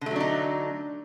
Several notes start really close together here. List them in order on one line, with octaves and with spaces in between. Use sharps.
D3 A3 F#3 D4 D#4